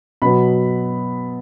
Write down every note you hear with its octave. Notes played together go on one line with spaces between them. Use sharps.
B2 F#3 B3 B5